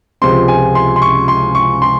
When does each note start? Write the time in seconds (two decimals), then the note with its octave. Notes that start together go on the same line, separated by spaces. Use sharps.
0.21 C#2 C3 F3 G#3 C4 C6
0.48 G#5
0.75 C6
0.96 C6
1.02 C#6
1.28 C6
1.55 C#6
1.82 C6